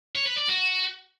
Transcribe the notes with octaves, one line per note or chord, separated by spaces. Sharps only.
C#5
B4
D5
F#4